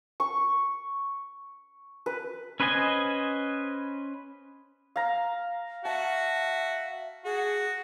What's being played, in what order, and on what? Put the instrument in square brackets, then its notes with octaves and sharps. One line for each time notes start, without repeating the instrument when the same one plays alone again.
[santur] C#6
B4
[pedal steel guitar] C#4 B4 C5 D#5 G#5
[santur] F5 A#5
[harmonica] F#4 [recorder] E5 [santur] A5
[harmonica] F#4 [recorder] G#4